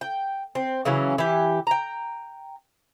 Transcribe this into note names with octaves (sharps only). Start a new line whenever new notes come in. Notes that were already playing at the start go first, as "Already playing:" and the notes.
G5
C4
C#3 E3 F#3 C#4
E3 G4
G5 A#5